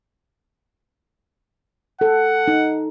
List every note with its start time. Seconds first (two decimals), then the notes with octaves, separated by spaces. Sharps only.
2.01 A4 F#5
2.48 D#4